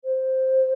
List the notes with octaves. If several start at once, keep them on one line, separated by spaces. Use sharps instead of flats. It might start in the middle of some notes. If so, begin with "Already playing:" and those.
C5